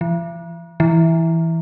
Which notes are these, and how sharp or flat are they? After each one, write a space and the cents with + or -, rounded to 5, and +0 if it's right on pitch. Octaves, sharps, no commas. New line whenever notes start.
E3 +45
E3 -5